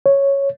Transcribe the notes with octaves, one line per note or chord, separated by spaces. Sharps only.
C#5